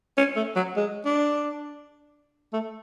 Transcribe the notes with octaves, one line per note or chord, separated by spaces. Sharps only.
C#4
A3
F#3
G#3
D4
A3